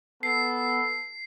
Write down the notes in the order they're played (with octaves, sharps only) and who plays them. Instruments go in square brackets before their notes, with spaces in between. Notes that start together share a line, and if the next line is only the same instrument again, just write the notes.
[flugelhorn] B3 [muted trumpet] A4 [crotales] C7